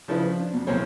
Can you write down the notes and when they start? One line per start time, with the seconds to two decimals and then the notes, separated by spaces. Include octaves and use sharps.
0.08 C#3 F3 D4 E4 F4 B4
0.26 F3
0.40 D4
0.54 F2 B2
0.67 B1 E2 A#3 C4 C5 C#5